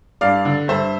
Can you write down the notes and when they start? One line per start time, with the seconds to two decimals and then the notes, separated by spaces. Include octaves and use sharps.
0.21 G2 D5 F5
0.45 D3
0.68 G2 C5 E5